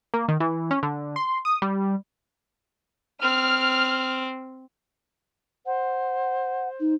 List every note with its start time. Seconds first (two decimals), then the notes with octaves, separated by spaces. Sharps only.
0.14 A#3
0.28 D#3
0.40 E3
0.71 C#4
0.83 D3
1.16 C6
1.45 D#6
1.62 G3
3.22 C4 F6
5.66 C5 F#5
6.80 D#4